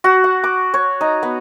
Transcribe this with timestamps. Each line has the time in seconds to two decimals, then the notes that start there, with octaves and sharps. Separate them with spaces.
0.04 F#4
0.24 F#5
0.44 D6
0.74 C#5
1.01 D#4
1.23 B3